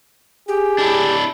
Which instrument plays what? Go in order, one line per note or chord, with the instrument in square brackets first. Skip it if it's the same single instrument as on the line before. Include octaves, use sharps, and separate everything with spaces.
[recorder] G4 [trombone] G#4
[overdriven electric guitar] D4 E4